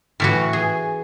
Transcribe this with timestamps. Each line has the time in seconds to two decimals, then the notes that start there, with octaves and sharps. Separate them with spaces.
0.20 A2 E3 F#4
0.53 G#4